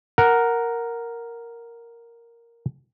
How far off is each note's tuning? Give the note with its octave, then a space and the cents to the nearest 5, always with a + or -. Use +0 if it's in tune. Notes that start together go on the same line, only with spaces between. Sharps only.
A#4 +0 F#5 +0